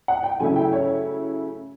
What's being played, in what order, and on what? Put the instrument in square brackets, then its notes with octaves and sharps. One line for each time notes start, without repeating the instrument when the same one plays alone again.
[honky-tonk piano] F#5
G5
C#3 F#3 A3 C#4 E4 G#5
G5
C#5